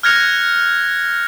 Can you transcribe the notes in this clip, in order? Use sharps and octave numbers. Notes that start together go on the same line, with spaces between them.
F6 F#6 G#6 A#6 C#7 F7